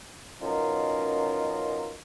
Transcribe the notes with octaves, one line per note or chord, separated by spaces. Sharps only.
F#2 B2 C#4 D#4 F4 A#4